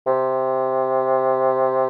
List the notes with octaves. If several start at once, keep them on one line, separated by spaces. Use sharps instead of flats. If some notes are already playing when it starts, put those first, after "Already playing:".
C3